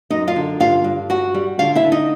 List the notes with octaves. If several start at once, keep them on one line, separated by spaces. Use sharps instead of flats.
F#2 D#4 D#5
F4 F5
D3
G2 F4 F5
G2
G3 F#4 F#5
G3
D3 F4 F5
E4 E5
D3
D#4 D#5